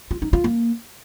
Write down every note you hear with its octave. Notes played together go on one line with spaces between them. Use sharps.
F4
D#4
F4
A#3